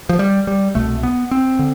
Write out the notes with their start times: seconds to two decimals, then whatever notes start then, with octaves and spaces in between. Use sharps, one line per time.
0.09 F3
0.19 G3
0.47 G3
0.75 C2 B2 A3
1.03 B3
1.31 C4
1.59 D3